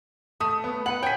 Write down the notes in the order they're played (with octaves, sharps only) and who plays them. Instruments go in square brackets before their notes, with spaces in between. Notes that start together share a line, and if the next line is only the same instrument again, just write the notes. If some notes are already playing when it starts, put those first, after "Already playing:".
[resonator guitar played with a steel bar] A3 [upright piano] D#6
[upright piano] B3
[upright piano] B4 B5 F#7 [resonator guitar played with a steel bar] F#5
[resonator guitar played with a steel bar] C#5 G#5 [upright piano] G5 B6